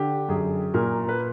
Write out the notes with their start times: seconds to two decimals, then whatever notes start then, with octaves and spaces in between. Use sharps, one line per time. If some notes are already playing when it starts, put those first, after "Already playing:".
Already playing: D3 G4
0.29 F#2 G#4
0.74 A#2 A#4
1.09 B4